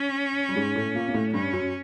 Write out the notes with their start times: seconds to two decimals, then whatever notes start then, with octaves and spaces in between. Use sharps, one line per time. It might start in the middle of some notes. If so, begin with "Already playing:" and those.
Already playing: C#4
0.49 G3
0.55 G#2 G#3
0.75 A2 A3
0.95 A#2 A#3
1.08 A#3
1.14 A2 A3
1.33 G2 G3 C#4
1.53 F#2 F#3